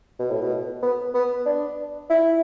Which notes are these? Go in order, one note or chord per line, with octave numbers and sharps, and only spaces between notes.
B2
A2
B2
B3
B3
D4
E4